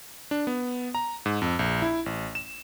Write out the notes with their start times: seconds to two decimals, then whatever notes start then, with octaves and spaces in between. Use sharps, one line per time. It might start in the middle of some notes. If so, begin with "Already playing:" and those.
0.31 D4
0.47 B3
0.95 A#5
1.26 G#2
1.42 F2
1.59 A#1
1.82 E4
2.06 A1
2.35 E7